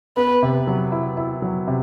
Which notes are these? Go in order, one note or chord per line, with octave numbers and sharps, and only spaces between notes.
B3 B4
C3
F#3
E4
E4
F#3
C3